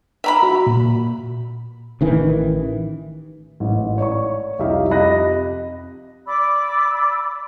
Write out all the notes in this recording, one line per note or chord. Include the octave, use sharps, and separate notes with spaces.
E5 A#5 B5
F#4
A#2
A1 D#3 E3
A1 G#2
C#5 D5 C#6
C2 F2 D#4 G4 E5 F5
F2 G4 D#5 B5 F#6 A#6
D5 B5 D6 E6